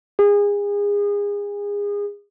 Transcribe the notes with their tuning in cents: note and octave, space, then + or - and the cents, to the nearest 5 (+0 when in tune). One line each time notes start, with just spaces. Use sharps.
G#4 -30